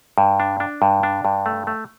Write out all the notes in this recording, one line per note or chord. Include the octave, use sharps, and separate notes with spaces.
G2
D4
D4
G2
D4
G2
A3
A3